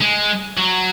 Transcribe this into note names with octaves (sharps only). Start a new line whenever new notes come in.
G#3
F#3